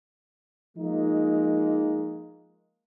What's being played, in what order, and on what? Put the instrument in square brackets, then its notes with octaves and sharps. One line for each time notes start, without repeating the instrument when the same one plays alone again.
[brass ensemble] F3 G#3 A#3 D#4